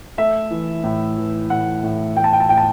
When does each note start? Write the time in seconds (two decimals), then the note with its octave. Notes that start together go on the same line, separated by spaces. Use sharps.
0.18 A3 E5
0.50 E3
0.84 A2
1.18 E3
1.50 A2 F#5
1.84 A2
2.16 A3 G5
2.24 A5
2.33 G5
2.40 A5
2.49 A2 G5
2.57 A5